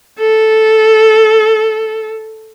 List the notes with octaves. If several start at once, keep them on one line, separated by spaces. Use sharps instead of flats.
A4